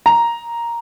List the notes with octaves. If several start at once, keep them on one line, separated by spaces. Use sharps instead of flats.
A#5